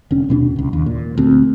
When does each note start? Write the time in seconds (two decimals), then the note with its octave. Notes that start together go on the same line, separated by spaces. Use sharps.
0.11 F1 D3 C#4
0.29 D#2 B2 A#3 D4
0.56 F#1 C#2
0.73 D#2
0.86 A#2
1.18 D2 C4